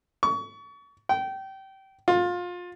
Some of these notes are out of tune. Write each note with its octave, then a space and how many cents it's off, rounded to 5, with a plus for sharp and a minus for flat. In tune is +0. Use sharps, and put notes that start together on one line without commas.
C#6 +30
G5 -25
F4 +25